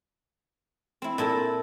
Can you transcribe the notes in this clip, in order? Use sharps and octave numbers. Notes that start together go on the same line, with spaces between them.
C4 E4
A#2 E4 A4 A5